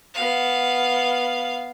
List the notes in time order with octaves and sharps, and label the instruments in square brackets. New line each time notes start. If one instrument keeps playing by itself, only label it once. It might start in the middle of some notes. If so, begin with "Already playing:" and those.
[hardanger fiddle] B3 F5